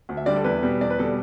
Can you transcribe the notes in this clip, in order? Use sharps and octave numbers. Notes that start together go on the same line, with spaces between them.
D2
E5
D3 G3 D5
A4
E2 B4
B2 G3
E2 D5
B4
B2 G3 A4